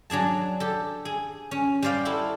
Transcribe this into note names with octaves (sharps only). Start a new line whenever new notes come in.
F#3 D4 G#4 A5
G4 A4
G#4
C#4
G3 C5 D5 F5 G5
E4 F#4 A4